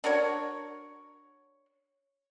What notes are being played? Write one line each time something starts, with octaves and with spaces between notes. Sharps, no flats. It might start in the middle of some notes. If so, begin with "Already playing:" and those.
D4 F#4 A#4 C#5